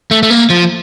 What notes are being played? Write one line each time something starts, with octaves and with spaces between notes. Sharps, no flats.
A3
A3
A#3
F3